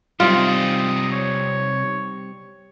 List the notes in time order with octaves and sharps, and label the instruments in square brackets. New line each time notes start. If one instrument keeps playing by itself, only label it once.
[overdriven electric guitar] C3 D#4 [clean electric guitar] G3 C4 [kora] F4 [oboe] D#6
[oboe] C#5